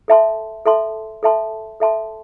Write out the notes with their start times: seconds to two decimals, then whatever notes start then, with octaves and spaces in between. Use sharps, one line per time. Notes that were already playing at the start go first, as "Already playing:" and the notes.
0.08 A4 E5 A5 C6
0.66 A4 E5 A5 C6
1.23 A4 E5 A5 C6
1.80 A4 E5 A5 C6